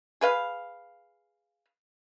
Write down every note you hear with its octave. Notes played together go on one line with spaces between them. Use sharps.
G#4 B4 F5